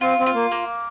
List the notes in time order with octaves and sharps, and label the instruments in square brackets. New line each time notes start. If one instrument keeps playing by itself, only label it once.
[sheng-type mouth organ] C4 [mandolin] F4
[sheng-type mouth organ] C4
[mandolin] F4
[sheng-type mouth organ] A#3
[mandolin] A#3